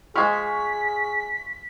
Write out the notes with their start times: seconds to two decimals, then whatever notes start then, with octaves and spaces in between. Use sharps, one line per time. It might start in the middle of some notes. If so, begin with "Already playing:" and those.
0.16 F3 G#3 G#4 C5 C6 C#6 F6 B6